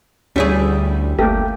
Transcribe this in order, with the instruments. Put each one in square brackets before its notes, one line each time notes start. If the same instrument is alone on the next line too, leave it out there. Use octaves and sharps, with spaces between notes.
[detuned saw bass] D2 [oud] G3 E4 G#4 [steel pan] C#4
[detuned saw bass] G1 [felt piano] A3 [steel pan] A#3 G4